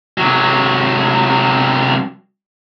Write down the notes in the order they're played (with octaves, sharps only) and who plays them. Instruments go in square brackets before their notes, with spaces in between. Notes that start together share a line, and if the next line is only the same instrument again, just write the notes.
[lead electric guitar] C3 F#3